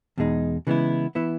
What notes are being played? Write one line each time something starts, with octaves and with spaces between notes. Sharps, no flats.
E2 B2 G#3 D#4
C#3 E3 G#3 B3 E4
E3 B3 E4